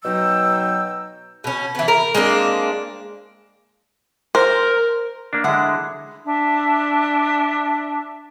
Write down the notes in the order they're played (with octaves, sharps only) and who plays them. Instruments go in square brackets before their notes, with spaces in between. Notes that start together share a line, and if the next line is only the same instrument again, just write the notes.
[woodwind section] B2 F#3 D#4 G5 E6
[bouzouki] B2 C#4
E3 B3
A#4
G#3 A#3 C4 D4
[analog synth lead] A#4 [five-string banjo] C5
[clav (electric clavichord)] A#3 D4
[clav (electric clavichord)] D3 G#3 [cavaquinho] E4 F#5
[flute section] D4 E5